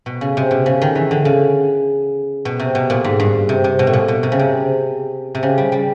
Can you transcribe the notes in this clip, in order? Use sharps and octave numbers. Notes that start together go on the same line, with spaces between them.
B2
C#3
C3
B2
C#3
D#3
E3
D3
C#3
B2
C3
B2
A#2
G#2
G2
C3
C3
B2
A2
A#2
B2
C3
C#3
C3
C3
C#3
G3
G3